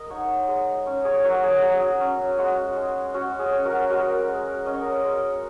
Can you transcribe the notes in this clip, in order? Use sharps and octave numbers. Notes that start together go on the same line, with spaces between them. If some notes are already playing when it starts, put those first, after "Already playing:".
Already playing: G#3 A#4 D#5
D#4 C#5 F#5
G#3
C#4
G#4 C#5
F#3 F#4 A#4
G#4
F#3 G#4
C#4
G#3 F#4
G#3
C#4 F#4
G#4
C#4
F#4 A#4
G#3 F#4 A#4
G#3
C#4 D#5
C#5
A#4 D#5
G#3